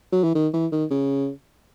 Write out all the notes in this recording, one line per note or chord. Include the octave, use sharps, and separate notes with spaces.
F#3
E3
D#3
E3
D#3
C#3